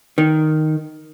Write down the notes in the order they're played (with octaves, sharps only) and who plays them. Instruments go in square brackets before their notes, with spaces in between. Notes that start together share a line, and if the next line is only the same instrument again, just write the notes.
[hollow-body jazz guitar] D#3